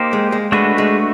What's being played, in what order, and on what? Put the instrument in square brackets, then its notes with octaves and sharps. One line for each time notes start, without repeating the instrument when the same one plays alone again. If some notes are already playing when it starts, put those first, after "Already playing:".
Already playing: [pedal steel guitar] A#3 D#4 G4 C5
[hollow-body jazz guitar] G#3
G#3
[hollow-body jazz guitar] G#3 [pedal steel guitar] A3 D4 F#4 B4
[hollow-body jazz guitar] G#3